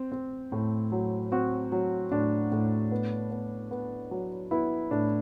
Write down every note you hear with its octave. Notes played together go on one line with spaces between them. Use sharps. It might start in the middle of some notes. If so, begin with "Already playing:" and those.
Already playing: C4
C4
A2
F#3
C4 F#4
F#3
A2 D4
A2
B3
B3
B3
F#3
B3 E4
A2 D4